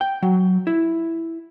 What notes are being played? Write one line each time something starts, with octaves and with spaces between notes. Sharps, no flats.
G5
F#3
E4